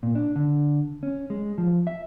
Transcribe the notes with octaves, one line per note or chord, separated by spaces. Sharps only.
A#2
D4
D3
C#4
G#3
F3
E5